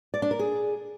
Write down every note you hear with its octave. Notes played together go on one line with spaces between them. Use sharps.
D5
D4
A#4
G#4